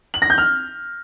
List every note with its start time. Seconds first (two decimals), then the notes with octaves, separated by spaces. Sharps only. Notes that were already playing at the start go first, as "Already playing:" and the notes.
0.14 F#7
0.22 A#6
0.30 G6
0.38 F6